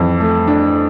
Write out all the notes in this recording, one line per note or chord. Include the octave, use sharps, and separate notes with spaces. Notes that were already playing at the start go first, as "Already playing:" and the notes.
Already playing: F2 E3
A3
D4